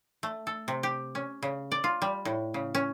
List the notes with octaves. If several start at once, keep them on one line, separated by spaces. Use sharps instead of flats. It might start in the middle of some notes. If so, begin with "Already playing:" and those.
A3
A4
C3
G4
C#4
C#3
D5
F4
G3
A2
C#3
C#4